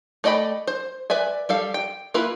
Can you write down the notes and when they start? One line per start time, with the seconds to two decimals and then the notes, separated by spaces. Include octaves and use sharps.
0.24 A3 D5 D#5 G5 B5
0.67 C5
1.10 B4 D5 E5 G#5
1.49 G3 A4 F5
1.74 G5
2.14 A#3 E4 F4 B4 B5